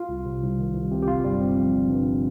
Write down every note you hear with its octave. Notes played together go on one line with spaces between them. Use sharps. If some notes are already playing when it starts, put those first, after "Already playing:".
Already playing: F4
C2
C3
C2
D#3
C2
C3
G4
G1 F4
G2 G3
G1 C4
F3
G1
G2